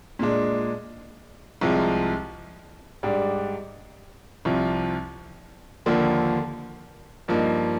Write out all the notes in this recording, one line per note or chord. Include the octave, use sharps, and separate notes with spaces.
A#2 G#3 D4
C2 C3 F3 G#3
G#2 G3 D4
C2 C3 F3
D#2 D3 F3 A#3
G2 F3 A#3 D#4